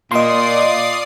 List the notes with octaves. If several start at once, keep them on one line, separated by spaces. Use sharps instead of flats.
A#2 D5 D#5 F5 A#5 C6 D#6 C7